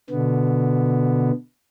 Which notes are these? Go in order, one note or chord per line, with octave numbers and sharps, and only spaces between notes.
B2 D3 B3